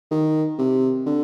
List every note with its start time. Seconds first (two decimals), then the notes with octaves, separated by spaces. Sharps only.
0.11 D#3
0.59 C3
1.06 D3